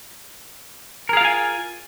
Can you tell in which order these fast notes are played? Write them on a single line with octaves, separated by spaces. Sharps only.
A#4 G#4 F5 F4 G#5